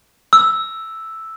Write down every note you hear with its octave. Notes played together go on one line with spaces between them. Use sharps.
E6